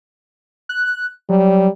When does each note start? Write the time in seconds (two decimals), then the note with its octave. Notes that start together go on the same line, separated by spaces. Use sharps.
0.69 F#6
1.29 F#3 G3